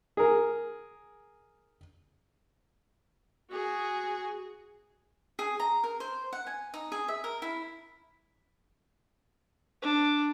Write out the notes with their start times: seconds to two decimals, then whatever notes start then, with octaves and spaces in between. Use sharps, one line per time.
0.17 G#4 A#4
3.51 F#4 G#4
5.39 G#4
5.60 A#5
5.84 A#4
6.00 C5
6.33 F#5
6.47 G#5
6.74 D#4
6.92 G#4
7.08 E5
7.24 A#4
7.42 E4
9.82 D4